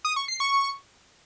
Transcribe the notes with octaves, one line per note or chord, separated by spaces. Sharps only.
D#6
C#6
C7
C#6